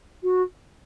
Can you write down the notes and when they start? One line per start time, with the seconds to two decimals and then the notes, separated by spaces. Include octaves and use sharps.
0.23 F#4